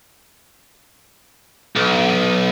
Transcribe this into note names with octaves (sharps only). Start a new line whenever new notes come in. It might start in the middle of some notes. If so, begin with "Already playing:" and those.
B1